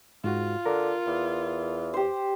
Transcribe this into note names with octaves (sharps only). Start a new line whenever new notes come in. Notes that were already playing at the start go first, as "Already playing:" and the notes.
G#2 F4 F#4
D3 A#4
E2
G4 C5